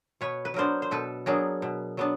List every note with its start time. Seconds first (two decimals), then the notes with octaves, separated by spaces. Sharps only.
0.21 B2 B4 C#5
0.45 B4
0.54 F#3 B3 D4 A#4 C5
0.82 C5
0.91 B2 A4 B4
1.26 F#3 B3 D4 G#4 A#4
1.62 B2
1.97 F#3 B3 D4